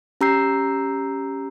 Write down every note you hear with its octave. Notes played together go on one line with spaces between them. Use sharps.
C#4 G4 A#5 E6 G6 C7